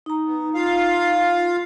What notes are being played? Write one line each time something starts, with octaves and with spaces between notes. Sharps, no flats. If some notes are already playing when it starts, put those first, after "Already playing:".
D#4 A#5
B3
F4 F5